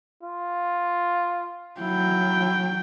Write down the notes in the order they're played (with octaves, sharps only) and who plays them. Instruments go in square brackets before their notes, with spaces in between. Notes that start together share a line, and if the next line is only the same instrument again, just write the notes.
[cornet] F4
[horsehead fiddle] F#3 G5 [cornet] E4